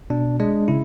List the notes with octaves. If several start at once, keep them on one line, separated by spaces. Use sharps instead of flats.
B2 D4
G#3 D4
C#3 E4